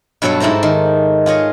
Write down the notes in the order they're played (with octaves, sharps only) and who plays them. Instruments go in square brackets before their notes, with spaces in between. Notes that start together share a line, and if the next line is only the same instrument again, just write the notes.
[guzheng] G2 B2 F#3 A4 C#5
G#2 E4 A4 C5 A#5
D#3
F4 G#4 C#5 D#5